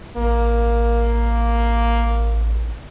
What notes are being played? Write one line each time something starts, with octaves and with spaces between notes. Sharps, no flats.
A1 A#3